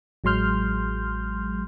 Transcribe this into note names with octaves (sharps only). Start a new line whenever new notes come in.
A1 F#3 G#3 C6 F6 G6